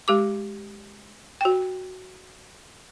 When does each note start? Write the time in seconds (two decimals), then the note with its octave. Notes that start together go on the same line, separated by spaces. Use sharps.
0.08 G#3 G4 D6
1.41 F#4 G5